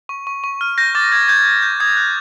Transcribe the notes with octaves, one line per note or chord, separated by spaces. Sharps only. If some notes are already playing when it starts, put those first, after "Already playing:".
C#6
C#6
C#6
F6
G6 A#6
D6 A6
G6 G#6
G6 G#6
G6
G6
D#6 G#6
F#6